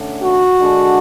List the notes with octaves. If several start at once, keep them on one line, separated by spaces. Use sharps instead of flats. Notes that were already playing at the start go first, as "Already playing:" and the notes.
Already playing: D3 A3 C#4
F#4
D3 G#3 D4